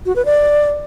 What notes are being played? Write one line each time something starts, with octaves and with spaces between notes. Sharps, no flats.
F#4
B4
D5